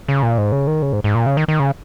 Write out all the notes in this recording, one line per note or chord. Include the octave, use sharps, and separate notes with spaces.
C#3
A#2
G#2
C#3
D#3
C#3
G#2
G#2
A#2
C#3
D#3
D#3
C#3